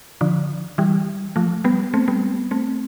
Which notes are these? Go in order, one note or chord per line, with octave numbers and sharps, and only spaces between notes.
D3 F3
E3 G3
F3 A3
G3 B3
A3 C4
G3 B3
A3 C4